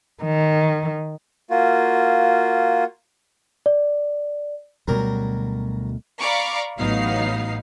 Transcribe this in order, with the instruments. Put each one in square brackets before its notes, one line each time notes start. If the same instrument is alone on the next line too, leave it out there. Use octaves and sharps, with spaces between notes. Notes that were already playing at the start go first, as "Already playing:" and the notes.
[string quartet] D#3
[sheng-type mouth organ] A#3 F4 F#4
[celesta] D5
[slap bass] D2 B2 A3 [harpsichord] F#3 G3 A#4
[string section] D5 F5 A#5 B5 C#6 D6
A1 F#3 B3 D#4 F5 C7